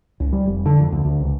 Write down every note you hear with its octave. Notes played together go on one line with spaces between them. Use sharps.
C#2
G3
F1
D3
F2
D2
D2
C#2